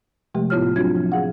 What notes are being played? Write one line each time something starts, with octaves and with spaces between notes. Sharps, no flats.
C3 F3 G#3 A3 G4
A2 B3 E4 F4 C#5 F6
F#3 C4 D4 F4 F#4 G#6
F3
G#4 F5 F#5